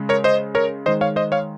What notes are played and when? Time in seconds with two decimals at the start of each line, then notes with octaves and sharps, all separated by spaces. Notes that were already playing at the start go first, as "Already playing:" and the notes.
Already playing: C#3 G#3
0.09 A#4 C#5
0.24 C5 D#5
0.55 A#4 C#5
0.86 D#3 G#3 C5 D#5
1.01 C#5 F5
1.16 C5 D#5
1.32 C#5 F5